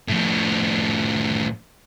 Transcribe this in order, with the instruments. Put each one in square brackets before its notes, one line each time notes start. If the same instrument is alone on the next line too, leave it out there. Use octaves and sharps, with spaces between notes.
[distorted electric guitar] A2 F3